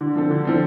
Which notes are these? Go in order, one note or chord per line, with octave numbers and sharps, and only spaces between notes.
D3
F3 C4 A4
D3
F3 C4 A4